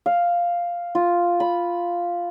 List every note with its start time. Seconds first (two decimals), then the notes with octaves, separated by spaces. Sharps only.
0.06 F5
0.95 F4
1.40 B5